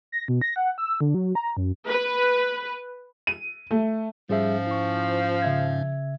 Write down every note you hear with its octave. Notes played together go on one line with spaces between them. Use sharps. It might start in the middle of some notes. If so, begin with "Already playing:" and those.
A#6
B2
A#6
F#5
E6
D3
F#3
A#5
F#2
B4
D#7
A3
G#2 F3 G3 C#4 G#4 E5
E4 C#6
C#3 E5 G#6